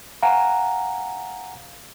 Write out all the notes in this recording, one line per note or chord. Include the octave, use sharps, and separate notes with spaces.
F5 F#5 G#5 A#5